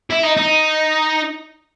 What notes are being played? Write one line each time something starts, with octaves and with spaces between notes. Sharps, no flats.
E4
D#4
D#4